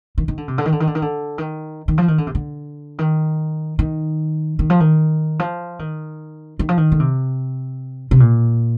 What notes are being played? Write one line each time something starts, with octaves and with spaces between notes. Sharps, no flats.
D#3
D#3
D3
C3
D3
D#3
D3
D#3
D3
D#3
D3
D#3
D#3
F3
D#3
D3
C3
D3
D#3
D#3
D#3
F3
D#3
F3
D#3
D#3
F3
D#3
D3
C3
C3
A#2